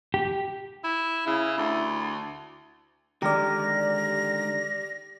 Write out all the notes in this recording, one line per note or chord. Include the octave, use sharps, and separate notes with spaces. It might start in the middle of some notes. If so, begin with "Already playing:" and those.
G4
E4
C#3 E4
D2
D3 D#3 G#3 G4 D5 A#5 F6 A#6